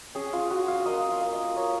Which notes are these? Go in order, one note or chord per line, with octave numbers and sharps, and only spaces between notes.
C#4 G#4
F4
F4 F#4
F5
A#3 D#5
F5
A#3
D#5
A#3 C#5